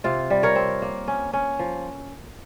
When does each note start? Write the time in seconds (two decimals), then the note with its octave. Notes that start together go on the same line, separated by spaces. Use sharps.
0.04 C3 F4
0.30 G3
0.43 A#4 C#5
0.55 C4
0.82 A#3
1.08 C#4
1.33 C#4
1.59 F3